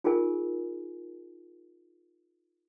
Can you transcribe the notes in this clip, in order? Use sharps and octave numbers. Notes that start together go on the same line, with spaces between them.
D#4 F4 G#4 A#4 G#5